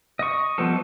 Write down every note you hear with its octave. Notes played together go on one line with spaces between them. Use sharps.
D#5 C#6
F3 G3 B3 C4 A4